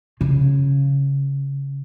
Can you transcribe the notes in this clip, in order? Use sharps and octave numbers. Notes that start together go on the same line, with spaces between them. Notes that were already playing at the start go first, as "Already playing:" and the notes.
C#3